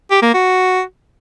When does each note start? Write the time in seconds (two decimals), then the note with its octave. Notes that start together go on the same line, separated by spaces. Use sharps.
0.11 G4
0.22 A#3
0.34 F#4